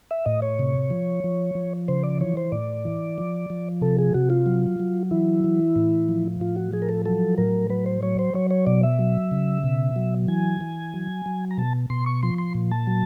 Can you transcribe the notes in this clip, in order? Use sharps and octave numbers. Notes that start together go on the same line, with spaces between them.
E5
A2 D#5
C#5
C3
F3
F3
F3
C#3 C5
D5
E3 C#5
C5
A2 D5
E3
F3
F3
C3 A4
G#4
C3 F#4
F4
F#3
F#3
E3 E4
E3
A2
F3
A2 F4
F#4
F3 G#4
A#4
A4
F#3 A4
A2 A#4
F#3 B4
C5
F#3 C#5
C5
F#3 C#5
C#5
B2 D5
E5
F#3
C#3
B2
F#3
E3 G#5
E3
F#3
F#3
A#5
B2 A5
B2 C6
C#6
F3 C6
C6
A#2
A5
F#3